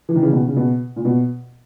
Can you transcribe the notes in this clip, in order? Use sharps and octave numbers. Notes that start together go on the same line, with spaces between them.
E3
D#3
C#3 E3
B2 D#3
C#3
B2
A#2
B2